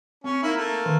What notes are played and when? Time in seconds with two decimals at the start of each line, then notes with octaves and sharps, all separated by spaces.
0.24 C4 C#4
0.43 A#3 D#4 E4
0.57 A3 A#3
0.86 D#3